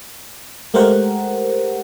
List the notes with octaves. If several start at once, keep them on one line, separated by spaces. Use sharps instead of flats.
G#3 A3 G4 A#4 C5 F#5